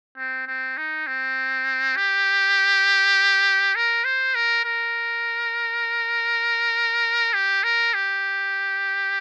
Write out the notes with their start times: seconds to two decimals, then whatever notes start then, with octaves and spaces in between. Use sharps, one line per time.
0.17 C4
0.47 C4
0.77 D#4
1.07 C4
1.97 G4
3.76 A#4
4.05 C5
4.35 A#4
4.65 A#4
7.34 G4
7.64 A#4
7.94 G4